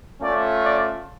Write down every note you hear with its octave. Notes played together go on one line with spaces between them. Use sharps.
A3 C#4 F4 D5
D5